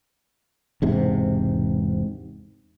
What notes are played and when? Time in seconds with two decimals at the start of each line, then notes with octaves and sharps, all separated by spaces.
0.82 E1 G#2 C3